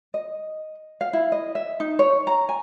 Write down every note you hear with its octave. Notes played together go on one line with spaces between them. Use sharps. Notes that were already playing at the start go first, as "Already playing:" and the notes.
D#5
F5
E4
D#5
E5
D#4
C#5
A#5
G#5